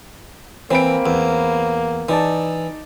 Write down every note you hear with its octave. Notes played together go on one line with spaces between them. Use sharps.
E3 A#3 C4 B5 D7
E2
E3 D#4 D5 A5